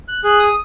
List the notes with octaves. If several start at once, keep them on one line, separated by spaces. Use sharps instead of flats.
F#6
G#4 F#6
D#6